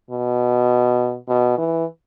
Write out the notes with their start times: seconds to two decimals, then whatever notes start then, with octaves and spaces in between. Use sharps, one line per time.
0.10 B2
1.29 B2
1.58 E3